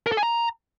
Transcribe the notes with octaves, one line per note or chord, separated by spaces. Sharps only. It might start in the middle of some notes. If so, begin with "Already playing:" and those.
A#4
A4
G#5
A#5